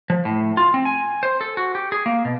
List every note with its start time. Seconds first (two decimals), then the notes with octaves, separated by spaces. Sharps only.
0.10 F3
0.25 A2
0.57 F4
0.74 C4
0.85 G#5
1.23 C5
1.41 A4
1.57 F#4
1.75 G4
1.92 G#4
2.06 A#3
2.25 B2